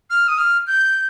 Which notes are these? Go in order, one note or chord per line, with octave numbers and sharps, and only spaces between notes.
F6
D#6
F6
G6